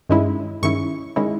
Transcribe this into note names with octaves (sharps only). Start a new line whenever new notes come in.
G2 D#3 G#3 C#4 E4
G2 D#3 G#3 C#4 E4 C#6
D#3 G#3 C#4 E4